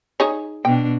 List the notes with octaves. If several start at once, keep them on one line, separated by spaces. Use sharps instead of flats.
D#4 G#4 C#5
B2 D4 G5